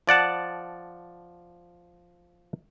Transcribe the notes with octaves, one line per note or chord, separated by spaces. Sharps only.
F3 D5 F#5 A5